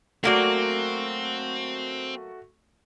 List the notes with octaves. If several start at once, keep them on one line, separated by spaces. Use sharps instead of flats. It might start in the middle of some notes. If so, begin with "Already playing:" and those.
F#3 A3 A#3 C4 F#4 D5